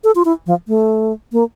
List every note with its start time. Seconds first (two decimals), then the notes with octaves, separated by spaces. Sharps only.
0.04 A4
0.15 F4
0.25 E4
0.46 F3
0.68 A3
1.32 A#3